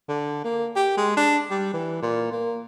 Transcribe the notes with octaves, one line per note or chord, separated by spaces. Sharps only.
D3
A#3
G4
G#3
D4
G3
E3
A#2
A#3